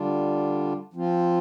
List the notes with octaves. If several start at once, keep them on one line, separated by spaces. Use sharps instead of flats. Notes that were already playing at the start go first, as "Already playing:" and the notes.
Already playing: D3 G3 D4 F4
F3 C4 F4